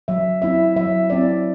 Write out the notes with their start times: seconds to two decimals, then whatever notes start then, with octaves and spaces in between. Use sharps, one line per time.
0.08 F#3 E5
0.42 C4 E4 E5
0.76 F#3 E5
1.10 C4 E4 D5